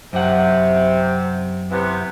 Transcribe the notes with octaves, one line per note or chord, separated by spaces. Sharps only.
F#2 C3 F#5
C3 E3 B3